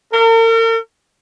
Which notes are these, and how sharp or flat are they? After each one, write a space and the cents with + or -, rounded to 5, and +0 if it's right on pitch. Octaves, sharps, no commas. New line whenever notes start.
A#4 -40